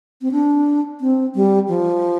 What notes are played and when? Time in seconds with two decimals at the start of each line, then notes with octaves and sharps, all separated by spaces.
0.22 C4
0.32 D4
1.01 C4
1.35 G3
1.68 F3